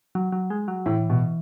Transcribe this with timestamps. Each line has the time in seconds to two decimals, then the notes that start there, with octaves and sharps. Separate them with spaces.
0.15 F#3
0.32 F#3
0.50 G#3
0.68 F#3
0.86 A2 E3
1.10 B2